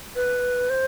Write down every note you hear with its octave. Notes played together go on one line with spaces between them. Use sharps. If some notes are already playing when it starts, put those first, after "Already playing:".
B4
C5